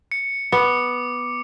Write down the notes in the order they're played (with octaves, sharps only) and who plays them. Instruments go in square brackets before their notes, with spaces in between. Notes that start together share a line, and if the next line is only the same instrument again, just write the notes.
[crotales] C#7
[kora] B3 [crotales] D6 C#7